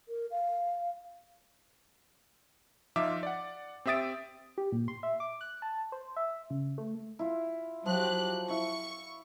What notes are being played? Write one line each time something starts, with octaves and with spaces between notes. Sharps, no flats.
A#4
F5
F3 D#4 F4 E5 D6
D5 F#5
C4 G4 E5 D#6 A6 D7
G4
A#2
C6
E5
D6
F#6
A5
C5
E5
C#3
A3
E4 F4
F3 F#3 G4 F#6
E4 F5 C#6